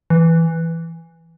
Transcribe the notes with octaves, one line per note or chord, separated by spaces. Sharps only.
E3